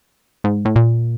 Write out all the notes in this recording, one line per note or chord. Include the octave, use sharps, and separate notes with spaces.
G#2
A2
A#2